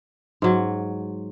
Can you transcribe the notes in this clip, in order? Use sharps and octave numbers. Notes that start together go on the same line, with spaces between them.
G#2 F#3